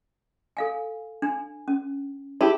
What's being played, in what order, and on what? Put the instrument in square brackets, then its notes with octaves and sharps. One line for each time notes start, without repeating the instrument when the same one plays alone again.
[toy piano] A4 F5 G#5
D4 G#5
C#4
[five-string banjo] E4 G4 [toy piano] G#4 A5 B5